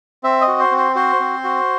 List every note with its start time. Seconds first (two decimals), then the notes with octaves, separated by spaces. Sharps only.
0.24 C4 E5
0.41 D#5
0.47 F#4
0.59 C5
0.71 C4
0.77 C5
0.95 F#4 C5
1.20 C4
1.44 F#4